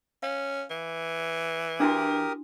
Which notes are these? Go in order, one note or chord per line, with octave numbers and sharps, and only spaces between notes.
C#4 F5
E3
D4 E4 F#4 G4 A#4 D#6